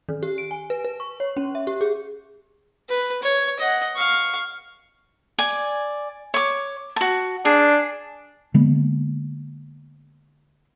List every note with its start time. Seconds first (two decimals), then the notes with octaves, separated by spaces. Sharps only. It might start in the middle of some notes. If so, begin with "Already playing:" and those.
0.09 D#3
0.23 G4
0.38 D7
0.51 G#5
0.70 B4
0.85 B4
1.00 C#6
1.20 C#5
1.37 C#4
1.55 E5
1.67 G4
1.81 G#4
2.89 B4
3.23 C#5
3.59 D#5 F#5
3.96 F5 C#6
5.39 D5 G#5
6.34 C#5 D6
6.96 F#4 A5
7.45 D4 G#4
8.54 D3 G#3 A#3 B3